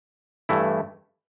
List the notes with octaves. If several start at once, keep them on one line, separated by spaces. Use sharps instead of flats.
G2 E3 A3 E4